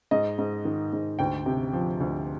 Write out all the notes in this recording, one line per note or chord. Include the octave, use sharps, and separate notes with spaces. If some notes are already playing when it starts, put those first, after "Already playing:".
G#2 D#5
G#2
D#3
G#2
D2 G5
C3
F3
D2